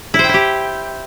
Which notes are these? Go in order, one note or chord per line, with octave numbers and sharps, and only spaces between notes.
E4
C5
G5
E4
G4